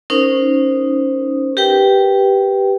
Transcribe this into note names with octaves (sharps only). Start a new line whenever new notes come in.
C#4 D#4 A#4 C5 D#6
G4 A#4 B4 G5